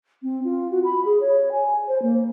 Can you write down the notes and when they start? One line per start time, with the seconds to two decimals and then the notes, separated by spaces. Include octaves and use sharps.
0.23 C4
0.44 F4
0.71 F#4
0.84 B5
1.05 G#4
1.20 C#5
1.52 G#5
1.88 C5
2.02 A#3